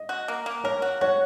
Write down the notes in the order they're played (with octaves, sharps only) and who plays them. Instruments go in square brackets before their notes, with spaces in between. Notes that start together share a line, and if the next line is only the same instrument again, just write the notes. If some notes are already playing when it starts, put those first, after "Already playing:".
Already playing: [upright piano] D#5
[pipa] F#4
A#3
A#3
[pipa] A#4 [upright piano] C#5
[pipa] F#4
[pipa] F#4 [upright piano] C#5